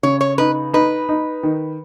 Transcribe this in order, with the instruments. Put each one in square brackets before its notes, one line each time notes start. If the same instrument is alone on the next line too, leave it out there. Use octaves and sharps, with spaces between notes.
[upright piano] C#3 [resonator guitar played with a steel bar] C#5
[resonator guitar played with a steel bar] C#5
[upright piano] D#4 [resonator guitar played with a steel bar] B4
[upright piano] D#4 [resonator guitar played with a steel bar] B4
[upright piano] D#4
D#3